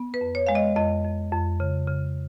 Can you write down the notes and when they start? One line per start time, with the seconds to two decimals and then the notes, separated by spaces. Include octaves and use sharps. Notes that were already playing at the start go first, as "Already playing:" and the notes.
Already playing: B3
0.14 B4
0.21 F2
0.35 C#5
0.47 G#3 F5
0.55 D#5
0.76 F2 D#5
1.04 F2
1.32 F2
1.60 C#3
1.88 C#3